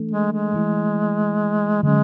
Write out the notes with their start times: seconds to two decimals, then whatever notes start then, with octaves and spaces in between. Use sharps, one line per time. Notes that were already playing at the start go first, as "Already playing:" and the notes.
Already playing: E3 A3 D4 A4
0.12 G#3
0.33 G#3
0.54 E3 A3 E4
1.83 D3 F#3 G#3 C#4